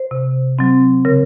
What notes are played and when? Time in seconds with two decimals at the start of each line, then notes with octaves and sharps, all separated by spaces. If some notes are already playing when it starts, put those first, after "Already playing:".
Already playing: C5
0.11 C3
0.59 F#3 C4
1.05 C#3 A#4